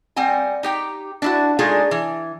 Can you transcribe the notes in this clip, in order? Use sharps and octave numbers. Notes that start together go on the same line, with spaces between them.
G3 C4 F#5 G#5
D#4 G4 G5
D4 E4 F#4
G#3 A3 D4 D#4 F4 G#4
E3